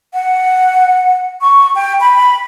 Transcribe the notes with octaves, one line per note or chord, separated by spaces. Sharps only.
F#5
C#6
G5
B5